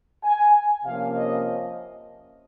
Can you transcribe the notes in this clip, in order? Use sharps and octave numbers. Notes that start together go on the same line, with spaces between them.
G#5
C3 F3 A#3 C#4 F5
D#5